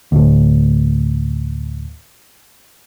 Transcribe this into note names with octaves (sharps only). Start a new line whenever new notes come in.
D2 A2